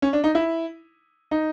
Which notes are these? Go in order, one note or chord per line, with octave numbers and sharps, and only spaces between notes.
C#4
D4
D#4
E4
D#4